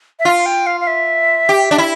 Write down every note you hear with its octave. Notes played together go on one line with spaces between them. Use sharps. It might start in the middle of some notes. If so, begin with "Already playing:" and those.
E5
F4 F5
G5
F5
F5
E5
G4
D4
E4